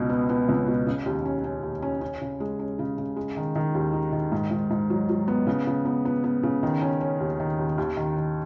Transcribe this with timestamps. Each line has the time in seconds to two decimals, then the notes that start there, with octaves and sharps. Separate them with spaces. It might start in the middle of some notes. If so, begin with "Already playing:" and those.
Already playing: C#2 B2
0.09 B3
0.29 B3
0.49 C#2
0.68 B2
0.86 C#3
1.06 D#2
1.25 C#4
1.44 C#4
1.63 D#2
1.82 C#4
2.01 C#4
2.21 C#3
2.40 G#3
2.59 C#4
2.79 C#3
2.98 C#3
3.16 G#3
3.37 D#3
3.55 D#3
3.75 D#2
3.93 D#4
4.12 D#3
4.32 G#2
4.51 G#2
4.71 G#2
4.90 F#3
5.09 F#3
5.28 B3
5.47 C#3
5.67 C#3
5.85 B3
6.05 B3
6.24 B3
6.43 C#3
6.63 D#3
6.81 C#4
7.01 C#4
7.20 D#2
7.40 D#3
7.59 D#2
7.78 D#2
7.97 D#3
8.16 D#3